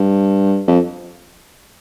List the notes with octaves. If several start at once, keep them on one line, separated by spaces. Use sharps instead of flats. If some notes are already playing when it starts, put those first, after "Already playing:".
Already playing: G2
F2